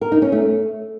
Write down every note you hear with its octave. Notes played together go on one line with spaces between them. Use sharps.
A#4
D#4
C#4
A3